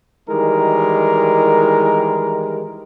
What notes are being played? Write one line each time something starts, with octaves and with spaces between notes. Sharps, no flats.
D#3 E3 G3 G#3 A#4